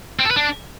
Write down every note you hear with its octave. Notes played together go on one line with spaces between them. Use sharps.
C4
A4
B4
D4